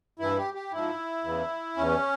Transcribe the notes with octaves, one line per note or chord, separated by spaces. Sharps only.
G2 E3 E4
G4
G4
G#2 F3 E4
E2 C#3 E3
E2 E3 C#4